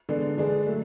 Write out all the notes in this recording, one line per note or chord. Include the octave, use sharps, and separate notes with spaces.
D3 G#3 B3 D4
D3 G#3 D4 G#4 B4
F#3 A3